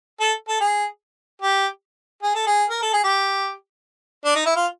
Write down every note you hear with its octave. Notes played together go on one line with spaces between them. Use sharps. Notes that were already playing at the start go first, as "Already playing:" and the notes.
A4
A4
G#4
G4
G#4
A4
G#4
A#4
A4
G#4
G4
D4
D#4
E4
F4